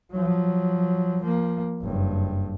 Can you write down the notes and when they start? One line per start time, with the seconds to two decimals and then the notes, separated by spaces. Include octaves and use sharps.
0.11 F3 F#3
1.22 F3 A#3
1.81 F#1 G2